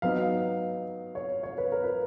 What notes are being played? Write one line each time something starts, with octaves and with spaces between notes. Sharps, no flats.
F#3 B3 D#4 F5
C#5
C#5
B4
A#4
B4